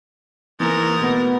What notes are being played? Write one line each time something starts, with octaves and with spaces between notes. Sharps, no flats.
G#2 E3 A#3 A#4
B2 A3 B3